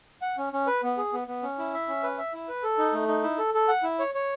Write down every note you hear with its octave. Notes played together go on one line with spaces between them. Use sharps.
F#5
C#4
C#4
B4
B3
G#4
B3
B3
C#4
E4
E5
C#4
B4
E5
E4
B4
A4
D#4
A3
D#4
E4
A4
A4
F#5
E4
C#5
C#5